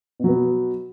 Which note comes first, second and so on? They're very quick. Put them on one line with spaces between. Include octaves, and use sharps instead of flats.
B2 F#3 B3